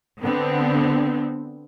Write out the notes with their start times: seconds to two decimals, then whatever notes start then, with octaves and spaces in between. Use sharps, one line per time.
0.21 D3 B3 C4